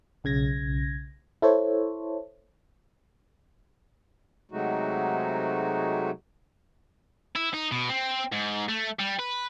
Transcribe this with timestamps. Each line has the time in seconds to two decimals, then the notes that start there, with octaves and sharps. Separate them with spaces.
0.24 B1 C#3 G#6 A#6
1.42 E4 A4 C5 C#5
4.51 C3 F#3 G#3 A3 D#4 F#4
7.36 E4
7.54 D#4
7.72 B2
7.89 C4
8.32 G#2
8.68 A3
8.99 G3
9.19 B4